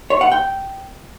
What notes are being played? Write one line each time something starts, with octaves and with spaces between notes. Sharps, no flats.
C#5
F#5
G5